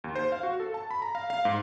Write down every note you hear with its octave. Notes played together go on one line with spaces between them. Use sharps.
D#2
C5
F5
F#4
A4
A5
B5
A#5
F5
F5
G#2